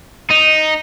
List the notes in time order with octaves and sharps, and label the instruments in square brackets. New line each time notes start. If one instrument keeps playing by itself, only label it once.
[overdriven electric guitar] D#4